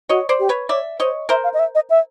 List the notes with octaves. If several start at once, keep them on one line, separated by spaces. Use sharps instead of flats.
F#4 C#5 D#5
C5 D5
G4
B4 C#5
C#5 D5 E5
C5 C#5 D#5
A#4 C5 E5
F5
D#5
E5
D#5
E5